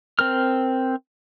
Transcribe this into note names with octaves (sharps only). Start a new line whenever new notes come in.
C4 A#4 F6